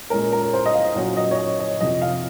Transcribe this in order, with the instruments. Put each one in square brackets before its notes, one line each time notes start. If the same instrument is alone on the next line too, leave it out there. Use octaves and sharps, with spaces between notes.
[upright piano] A#2 G#3 C#4 A#4
A#4
C5
D#5
F5
A#2 F#3 A#3 C#4 F#5
D#5
C#5
D#5
D#5
F2 C3 F3 D#5
F5